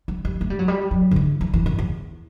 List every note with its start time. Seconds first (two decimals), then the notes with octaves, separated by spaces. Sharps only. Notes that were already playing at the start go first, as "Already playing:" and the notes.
0.08 G3
0.25 G3
0.41 A3
0.50 G3
0.59 F#3
0.68 G3
0.91 F#3
1.11 D3
1.16 E3
1.41 E3
1.54 E3
1.66 F#2
1.79 E2